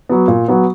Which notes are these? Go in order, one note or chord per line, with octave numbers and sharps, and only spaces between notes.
F#3 B3
A#2
F#3 B3